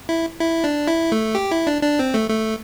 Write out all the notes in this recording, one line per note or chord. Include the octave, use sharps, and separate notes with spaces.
E4
E4
D4
E4
A3
G4
E4
D4
D4
C4
A3
A3